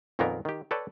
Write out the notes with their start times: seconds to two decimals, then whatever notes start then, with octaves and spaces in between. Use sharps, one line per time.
0.19 F2 A#2 D#3 A#3 B3 A#4
0.45 D#3 G4
0.71 A4 B4 C#5 D5 G5 A5